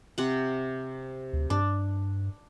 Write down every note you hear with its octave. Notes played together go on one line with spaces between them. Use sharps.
C3 F#5
D2
G2 D4